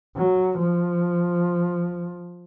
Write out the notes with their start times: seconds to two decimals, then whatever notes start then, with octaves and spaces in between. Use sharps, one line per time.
0.16 F#3
0.59 F3